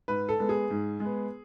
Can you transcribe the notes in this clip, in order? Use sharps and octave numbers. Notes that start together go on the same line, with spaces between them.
G#2 B4
A4
G#3 B3
G#4
G#2
G#3 B3